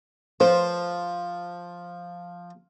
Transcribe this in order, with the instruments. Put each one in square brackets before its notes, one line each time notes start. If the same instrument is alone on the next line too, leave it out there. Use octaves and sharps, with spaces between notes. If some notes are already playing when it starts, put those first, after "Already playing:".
[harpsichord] F3 [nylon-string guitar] C5